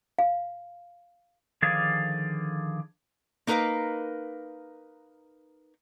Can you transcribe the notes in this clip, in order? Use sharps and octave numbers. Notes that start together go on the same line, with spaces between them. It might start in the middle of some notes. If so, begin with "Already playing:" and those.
F5
D3 D#3 F3 G#4 D5 F5
A#3 D#4 A#4 B4 F5